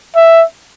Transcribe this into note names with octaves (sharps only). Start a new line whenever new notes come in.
E5